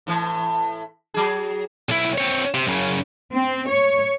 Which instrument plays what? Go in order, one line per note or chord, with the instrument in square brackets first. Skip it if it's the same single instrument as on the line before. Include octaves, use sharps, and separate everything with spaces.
[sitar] A2 E3
F#3 G#4
[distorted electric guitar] B1 E4
C4 C#5
C3
F#2 C#3
[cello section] C4
C#5